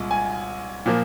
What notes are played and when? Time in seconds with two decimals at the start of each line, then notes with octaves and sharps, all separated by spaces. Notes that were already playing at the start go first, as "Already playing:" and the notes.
Already playing: C2 A#2 G#3
0.11 G#5
0.86 A#2 F3 A#3